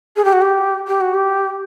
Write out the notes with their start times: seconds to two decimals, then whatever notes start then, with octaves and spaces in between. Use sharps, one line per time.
0.16 G#4
0.25 G4
0.33 F#4
0.42 G4
0.87 G4
1.01 F#4
1.14 G4